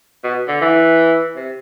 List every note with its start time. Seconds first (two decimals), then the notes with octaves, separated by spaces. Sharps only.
0.24 B2
0.48 D3
0.61 E3
1.36 C3